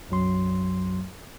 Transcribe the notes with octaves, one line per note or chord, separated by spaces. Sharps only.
B1 F#2 F#3 C6